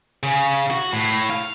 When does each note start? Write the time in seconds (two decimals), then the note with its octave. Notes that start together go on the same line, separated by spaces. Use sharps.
0.23 C#3
0.70 F#4
0.93 A2
1.30 F5